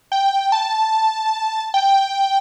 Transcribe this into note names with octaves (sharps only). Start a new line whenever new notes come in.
G5
A5
G5